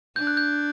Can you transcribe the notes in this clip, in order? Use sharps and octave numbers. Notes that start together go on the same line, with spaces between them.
D4 G6
F#6
G6